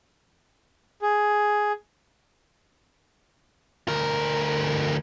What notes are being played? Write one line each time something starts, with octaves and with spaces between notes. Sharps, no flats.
G#4
D2 A#4